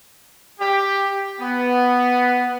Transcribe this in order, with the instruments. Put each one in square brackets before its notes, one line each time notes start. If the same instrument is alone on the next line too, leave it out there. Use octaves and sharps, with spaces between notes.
[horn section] G4
B3